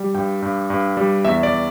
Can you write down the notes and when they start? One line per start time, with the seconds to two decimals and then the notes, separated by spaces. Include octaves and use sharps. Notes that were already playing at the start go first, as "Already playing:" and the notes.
Already playing: G3
0.15 G2 G5
0.42 G2
0.70 G2
0.97 G3
1.25 E2 E5
1.43 D5